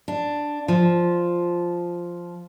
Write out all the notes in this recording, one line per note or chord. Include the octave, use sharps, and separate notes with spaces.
D4
F3